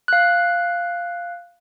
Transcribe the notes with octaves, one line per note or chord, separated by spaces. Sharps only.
F5 F#6